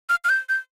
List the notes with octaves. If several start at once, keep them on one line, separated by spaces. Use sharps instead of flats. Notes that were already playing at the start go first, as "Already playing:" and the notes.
F6
F6
G6
G6